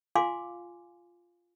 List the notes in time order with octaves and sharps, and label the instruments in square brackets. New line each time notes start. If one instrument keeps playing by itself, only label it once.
[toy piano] F4 F5 G#5 C6 D6